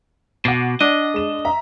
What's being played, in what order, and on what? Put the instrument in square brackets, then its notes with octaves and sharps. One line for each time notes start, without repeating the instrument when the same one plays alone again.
[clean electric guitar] B2 [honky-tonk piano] F#5 D6 C7
[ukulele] D4 [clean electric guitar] D#5
[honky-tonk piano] G#3 E7
E5 A#5